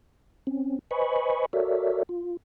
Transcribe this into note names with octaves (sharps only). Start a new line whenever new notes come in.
C4 C#4
B4 C5 D#5 G#5 B5 C#6
F#4 A4 A#4 C#5 D5 E5
F4